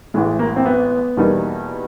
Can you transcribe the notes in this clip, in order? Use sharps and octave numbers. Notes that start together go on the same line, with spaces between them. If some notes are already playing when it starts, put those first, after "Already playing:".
A1 A2 E3 G#3
A#3
C4
B3
E2 B2 G3 A#3 D#4